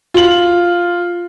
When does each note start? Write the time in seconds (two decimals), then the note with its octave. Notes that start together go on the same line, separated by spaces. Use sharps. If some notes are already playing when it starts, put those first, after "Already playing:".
0.14 F4 F#7